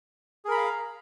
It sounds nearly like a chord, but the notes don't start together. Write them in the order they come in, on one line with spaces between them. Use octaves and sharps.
G#4 A#4 B5 A#5 F5